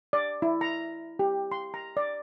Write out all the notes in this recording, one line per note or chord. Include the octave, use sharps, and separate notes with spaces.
D5
E4
A#5
G4
C6
A#5
D5